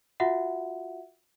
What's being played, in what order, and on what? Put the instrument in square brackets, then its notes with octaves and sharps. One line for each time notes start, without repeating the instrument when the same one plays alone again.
[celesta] F4 F#4 E5 F#5